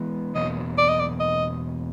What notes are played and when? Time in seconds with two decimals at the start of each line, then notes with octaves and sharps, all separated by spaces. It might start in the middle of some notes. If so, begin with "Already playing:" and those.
Already playing: E3 G#3 B3
0.35 E2 B2 F#3 A#3 D#5
0.78 D5
0.89 D#5
1.00 D5
1.20 D#5